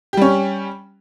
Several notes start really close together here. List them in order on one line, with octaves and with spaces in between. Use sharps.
G4 G3 C#4